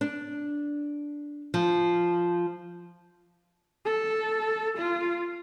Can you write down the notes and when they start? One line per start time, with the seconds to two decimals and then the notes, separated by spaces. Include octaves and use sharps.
0.01 D4
1.54 F3
3.86 A4
4.78 F4